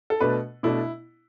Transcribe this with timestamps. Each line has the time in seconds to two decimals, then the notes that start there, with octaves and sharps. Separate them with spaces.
0.10 A4
0.20 B2 A3 D4 B4
0.63 B2 A3 D4 E4